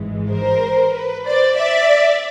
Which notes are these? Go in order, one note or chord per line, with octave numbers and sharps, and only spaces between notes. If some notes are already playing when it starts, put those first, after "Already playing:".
Already playing: G#1 G#2 E3 G#3
A#4 C5
B4
C5 D5
D5 E5